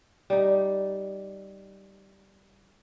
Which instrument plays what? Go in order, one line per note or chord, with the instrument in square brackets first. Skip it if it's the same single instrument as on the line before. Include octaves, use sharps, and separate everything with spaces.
[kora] G3 D#4